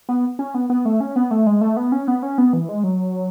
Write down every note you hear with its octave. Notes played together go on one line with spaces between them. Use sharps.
B3
C#4
B3
B3
A3
C#4
B3
A3
G#3
A3
B3
C#4
B3
C#4
B3
E3
G#3
F#3